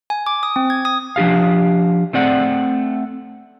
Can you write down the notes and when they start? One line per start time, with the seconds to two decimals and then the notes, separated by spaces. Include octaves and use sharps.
0.10 G#5
0.27 D6
0.43 D#6
0.56 C4
0.70 G#6
0.85 D#6
1.16 F3 D4 G4 F5
2.13 A3 C4 D5 F#5